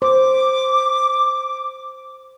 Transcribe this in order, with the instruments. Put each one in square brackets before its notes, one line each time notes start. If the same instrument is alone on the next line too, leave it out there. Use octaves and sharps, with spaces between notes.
[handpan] C5 [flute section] D6